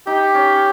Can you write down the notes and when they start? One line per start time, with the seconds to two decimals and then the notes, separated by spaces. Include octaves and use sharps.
0.07 D#4 G4
0.35 C#4